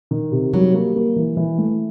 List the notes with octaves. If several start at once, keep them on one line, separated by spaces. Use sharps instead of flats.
D#3
C3
F#3 G3
A#3
A#3
E3
E3
A3